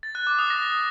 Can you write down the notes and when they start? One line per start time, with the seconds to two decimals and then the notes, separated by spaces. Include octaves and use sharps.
0.03 A6
0.15 F#6
0.27 D6
0.39 D#6
0.50 A#6